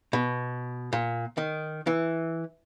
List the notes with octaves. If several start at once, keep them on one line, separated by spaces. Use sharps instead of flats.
B2
A#2
D#3
E3